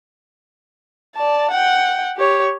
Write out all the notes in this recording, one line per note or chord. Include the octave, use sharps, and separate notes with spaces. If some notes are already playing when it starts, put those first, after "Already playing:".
D5 A5
F#5 G5
G4 C#5